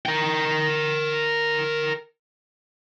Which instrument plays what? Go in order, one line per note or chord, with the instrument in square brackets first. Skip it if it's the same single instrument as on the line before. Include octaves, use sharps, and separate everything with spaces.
[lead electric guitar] A#4 G5